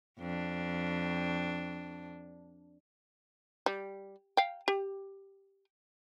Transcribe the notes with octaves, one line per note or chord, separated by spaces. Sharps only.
F2 D4
G3
F5 G5
G4